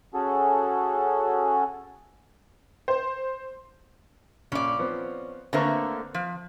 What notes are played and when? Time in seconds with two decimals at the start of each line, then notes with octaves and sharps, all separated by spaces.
0.14 C#4 F#4 G#4 A4
2.88 C5
4.52 A#1 C#4 D5
4.79 F3 B3 C4
5.53 D3 A3 A#3 C4 B4 C#6
6.14 F3